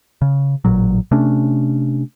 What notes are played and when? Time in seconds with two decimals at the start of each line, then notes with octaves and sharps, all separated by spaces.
0.22 C#3
0.65 A1 A#2 F#3
1.11 C3 A3 C#4 D4